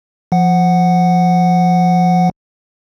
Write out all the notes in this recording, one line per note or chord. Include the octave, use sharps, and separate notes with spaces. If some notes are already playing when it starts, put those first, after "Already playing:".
F3 F#5